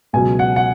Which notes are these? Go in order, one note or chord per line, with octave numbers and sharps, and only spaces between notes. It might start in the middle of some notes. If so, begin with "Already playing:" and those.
C#2 B2 F#3 G#5
F#5
F#5